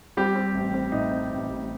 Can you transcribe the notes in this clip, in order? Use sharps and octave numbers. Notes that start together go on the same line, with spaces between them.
G3 C4 G4
C4
A1
C4
A2 D#4
C4
A1
A1